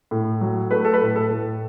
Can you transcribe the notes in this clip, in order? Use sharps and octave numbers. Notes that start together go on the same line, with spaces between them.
A2
F#3
A3 B4
A4
B4
A2
A4
A2